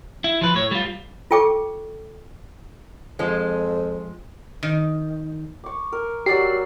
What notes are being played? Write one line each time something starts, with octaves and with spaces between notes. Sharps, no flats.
E4
F3 B4
A2 C#5
G3 F4
F4 A4 G5 C#6 D6
F2 F3 G#3
D#3
C#6 D6
A#4
F#3 G4 D5 E6 C7